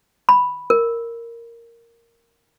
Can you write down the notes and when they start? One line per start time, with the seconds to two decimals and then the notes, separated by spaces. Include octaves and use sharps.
0.29 B5
0.70 A#4